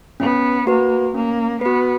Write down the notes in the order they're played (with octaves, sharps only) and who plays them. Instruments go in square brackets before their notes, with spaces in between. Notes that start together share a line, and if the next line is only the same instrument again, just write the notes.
[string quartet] B3 [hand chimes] C#4
[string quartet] A#3 [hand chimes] F#4 B4
[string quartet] A#3 [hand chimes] C#4
[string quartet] B3 [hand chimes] F#4 B4